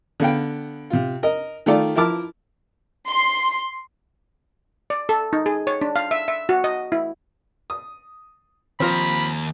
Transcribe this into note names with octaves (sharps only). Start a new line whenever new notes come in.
D3 B3 F5 G5
C3 F4
A#4 D#5
D#3 A3 F4 D5
F3 E4 A#4 A5 D6 F6
C6
D5
A4
D#4
G#4
C#5
D4
F5
E5
E5
F#4
D#5
E4
D#6
D#2 F3 C4 A#5 B5